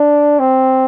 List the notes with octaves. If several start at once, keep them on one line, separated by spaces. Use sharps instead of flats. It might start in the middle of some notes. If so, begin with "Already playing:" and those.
Already playing: D4
C4